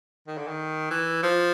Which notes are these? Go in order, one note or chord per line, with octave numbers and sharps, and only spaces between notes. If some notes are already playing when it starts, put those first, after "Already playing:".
D#3
D3
D#3
E3
F3